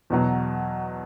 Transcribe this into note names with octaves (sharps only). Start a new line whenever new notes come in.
E2 B2 F#3